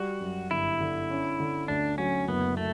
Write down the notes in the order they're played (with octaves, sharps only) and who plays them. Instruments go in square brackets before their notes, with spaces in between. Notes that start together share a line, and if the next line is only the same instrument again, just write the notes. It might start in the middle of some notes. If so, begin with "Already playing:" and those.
Already playing: [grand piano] G3 [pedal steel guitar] F#4
[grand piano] F#2
[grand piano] G1 [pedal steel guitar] E4
[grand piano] D3
C#4
D3
[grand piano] D2 [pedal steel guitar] D4
[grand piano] F#3 [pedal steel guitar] C#4
[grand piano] F#1 [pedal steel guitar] B3
[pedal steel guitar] A3